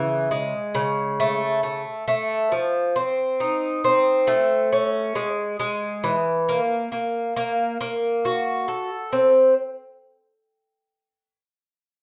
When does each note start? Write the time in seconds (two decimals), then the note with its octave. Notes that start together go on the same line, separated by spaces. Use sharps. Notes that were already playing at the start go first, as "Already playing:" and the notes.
Already playing: C#3 E3
0.31 G#3
0.75 C#3
1.20 A3
1.63 A3
2.08 A3
2.52 F3
2.96 C4
3.40 D#4
3.84 C4
4.27 A3
4.72 C#4
5.15 G#3
5.60 G#3
6.04 E3
6.49 A#3
6.92 A#3
7.36 A#3
7.81 A#3
8.25 F#4
8.68 A4
9.13 C4